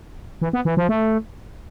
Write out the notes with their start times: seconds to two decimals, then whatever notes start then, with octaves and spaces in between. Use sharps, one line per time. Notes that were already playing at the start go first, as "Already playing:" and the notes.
0.42 E3
0.53 B3
0.65 E3
0.77 F3
0.89 A3